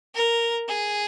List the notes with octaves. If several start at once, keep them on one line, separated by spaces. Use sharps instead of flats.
A#4
G#4